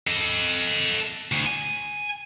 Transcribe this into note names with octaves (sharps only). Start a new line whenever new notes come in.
A4 D#5
D2
G#5